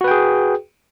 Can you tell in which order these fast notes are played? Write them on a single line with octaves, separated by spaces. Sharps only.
F#4 B4 G5 G#4